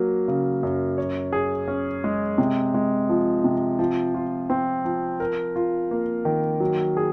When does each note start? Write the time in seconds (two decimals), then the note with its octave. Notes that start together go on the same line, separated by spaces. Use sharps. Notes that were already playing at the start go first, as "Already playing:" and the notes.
Already playing: F#3 A#3
0.28 C#3
0.63 F#2
0.98 C#5
1.33 G#4
1.68 C#4
2.04 G#3
2.38 C3
2.74 G#3
3.09 F3
3.44 C3
3.79 F3
4.14 F4
4.50 C4
4.85 F3
5.20 A#4
5.56 F4
5.91 A#3
6.25 D#3
6.60 F#3
6.97 G#4